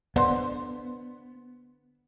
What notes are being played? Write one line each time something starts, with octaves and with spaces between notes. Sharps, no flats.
D3 B3 C5